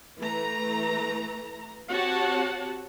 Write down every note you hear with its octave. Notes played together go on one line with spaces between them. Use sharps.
E3 A3 A#5
C4 F#4 G4 C#5 F#5 A5